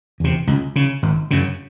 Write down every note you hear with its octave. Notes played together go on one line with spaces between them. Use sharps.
E2 C3
C#2
C#3
G#1
F#2 C#3